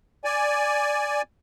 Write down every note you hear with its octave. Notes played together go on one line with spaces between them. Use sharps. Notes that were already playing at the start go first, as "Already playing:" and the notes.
D5 G#5